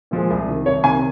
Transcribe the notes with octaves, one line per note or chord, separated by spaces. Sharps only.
A#2 F3 G#3
C2
C3 D#3
C2 C#5
C3 D#3 G#5